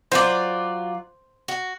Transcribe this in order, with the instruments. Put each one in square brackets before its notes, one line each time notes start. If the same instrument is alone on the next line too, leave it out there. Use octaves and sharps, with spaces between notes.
[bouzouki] F#3 F4 D5 [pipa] C5
[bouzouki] F#4